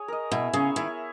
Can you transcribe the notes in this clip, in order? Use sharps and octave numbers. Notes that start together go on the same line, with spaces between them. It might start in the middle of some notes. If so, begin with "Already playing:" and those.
Already playing: G#4 C#5
A#4 D#5
B2 E4
C#3 G#4 C#5
D#3 E4